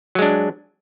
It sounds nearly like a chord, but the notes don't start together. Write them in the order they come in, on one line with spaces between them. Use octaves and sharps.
F#3 G#3 D4